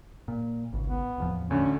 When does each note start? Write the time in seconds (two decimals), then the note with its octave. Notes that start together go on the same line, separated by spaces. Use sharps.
0.28 A#2
0.73 G#1 C#2
0.88 B3
1.18 D1 E2 F3
1.51 D2 D3 C#4